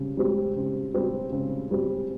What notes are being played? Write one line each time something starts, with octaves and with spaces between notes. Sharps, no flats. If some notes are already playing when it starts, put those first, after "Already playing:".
Already playing: C#3 G3 C4
G3 C4 G4
C#3
G3 C4 G4
C#3
G3 C4 G4